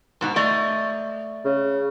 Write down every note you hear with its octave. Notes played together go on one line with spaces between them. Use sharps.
G#2 B2 D#4
A3 D5 D#5
C#3